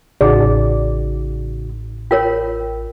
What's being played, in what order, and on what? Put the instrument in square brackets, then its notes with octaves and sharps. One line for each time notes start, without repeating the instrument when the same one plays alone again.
[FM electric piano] A1 [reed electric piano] C#3 D#4 F#4 [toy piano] G#4 [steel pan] D5
[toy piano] F4 A#4 C#5 [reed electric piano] G5